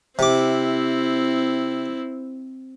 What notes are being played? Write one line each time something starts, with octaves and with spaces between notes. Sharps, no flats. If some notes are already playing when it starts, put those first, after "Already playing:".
C3 C4 E4 D6